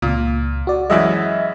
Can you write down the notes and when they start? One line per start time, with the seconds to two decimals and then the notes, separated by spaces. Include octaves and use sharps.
0.02 C#2 A#2
0.67 F#4 D5
0.90 F#2 E3 G#3 D#5 E5